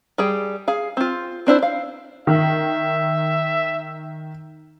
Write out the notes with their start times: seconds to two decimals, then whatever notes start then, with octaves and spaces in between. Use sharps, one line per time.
0.18 G3 G#4 G5
0.68 G#4 F5
0.97 C4 F4
1.47 C4 D4 E4 C5
1.63 F5
2.27 D#3 E5